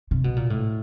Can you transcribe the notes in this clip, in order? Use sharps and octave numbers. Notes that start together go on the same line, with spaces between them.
C3
B2
A#2
A2